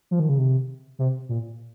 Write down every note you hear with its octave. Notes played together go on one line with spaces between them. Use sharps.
F3
D#3
C#3
C3
C3
A#2